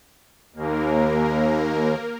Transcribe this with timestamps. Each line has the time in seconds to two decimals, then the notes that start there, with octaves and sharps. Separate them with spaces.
0.54 D#2 A#3 A#4